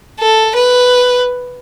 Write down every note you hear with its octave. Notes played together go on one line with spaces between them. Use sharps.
A4
B4